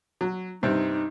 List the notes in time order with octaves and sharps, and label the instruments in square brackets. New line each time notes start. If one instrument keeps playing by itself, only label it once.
[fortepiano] F#3
[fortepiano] G2 C3 C4 [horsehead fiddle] D#4